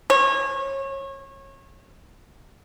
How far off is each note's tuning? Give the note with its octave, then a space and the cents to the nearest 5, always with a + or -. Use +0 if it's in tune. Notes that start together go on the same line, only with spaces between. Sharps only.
C#5 -25